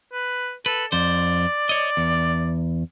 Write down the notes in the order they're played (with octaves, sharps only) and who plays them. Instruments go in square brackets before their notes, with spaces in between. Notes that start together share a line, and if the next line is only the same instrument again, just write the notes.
[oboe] B4
[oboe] A4 [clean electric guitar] B4
[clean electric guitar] F2 C5 [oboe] D5
[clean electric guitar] C#5 D#5
E2